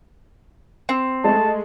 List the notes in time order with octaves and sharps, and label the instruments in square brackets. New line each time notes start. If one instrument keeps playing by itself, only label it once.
[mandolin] C4
[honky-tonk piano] G#3 A3 [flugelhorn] A5